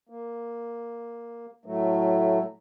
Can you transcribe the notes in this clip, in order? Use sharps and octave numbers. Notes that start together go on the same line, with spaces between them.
A#3
A2 F#3 A3